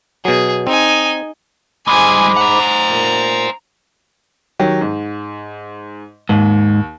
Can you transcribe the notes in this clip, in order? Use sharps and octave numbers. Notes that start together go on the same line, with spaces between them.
B2 F#3 G#4
C4 D#4 G#5
G#2 G3 G#3 G#5 B5 D6
C5 F#5 A#5
A#2
D#3 F#3 G4
G#2
D#2 G#2